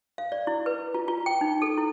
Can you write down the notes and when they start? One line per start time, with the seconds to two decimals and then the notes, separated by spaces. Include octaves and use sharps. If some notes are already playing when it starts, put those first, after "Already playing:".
0.18 F5
0.32 D5
0.47 E4
0.66 B4
0.94 F4
1.08 F4
1.26 G5
1.41 D#4
1.62 A4
1.78 E4